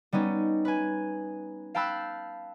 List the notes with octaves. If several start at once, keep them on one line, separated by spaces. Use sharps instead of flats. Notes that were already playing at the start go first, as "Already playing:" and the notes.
G3 B3 C#4 D#4
B4 G#5
F5 G5 A5 B5 E6 F#6